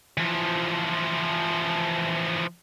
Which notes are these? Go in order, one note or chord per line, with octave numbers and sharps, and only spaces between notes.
E3 F3